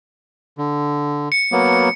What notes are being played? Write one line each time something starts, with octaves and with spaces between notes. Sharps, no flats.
D3
C#7
F#3 A#3 B3